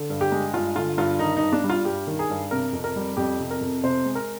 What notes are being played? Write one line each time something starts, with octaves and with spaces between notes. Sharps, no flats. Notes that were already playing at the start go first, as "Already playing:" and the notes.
Already playing: D3
G2
G4
G#3
G2 F4
D3 F4
G2 F4
D#3 D#4
D#4
G2
D4
G3
F4
G2 G4
D#3
G#4
G2
C3 A#4
F2
A#4
G3
F2 G4
C3
A#4
F2
C3 C5
G#3
A#4